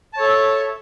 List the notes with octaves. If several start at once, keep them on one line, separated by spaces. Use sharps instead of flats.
A4 C#5 E5 A5